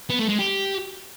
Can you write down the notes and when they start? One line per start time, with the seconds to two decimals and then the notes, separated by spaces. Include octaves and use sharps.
0.10 B3
0.19 A3
0.29 G#3
0.39 G4